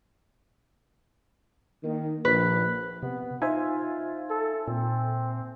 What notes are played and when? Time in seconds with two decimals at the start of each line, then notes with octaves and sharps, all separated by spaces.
1.84 D#3 A#3 D#4
2.25 A#1 B4
3.03 C3 B3
3.42 D#4 F4 C5 E5 G#5
4.30 A4
4.68 A#2 C4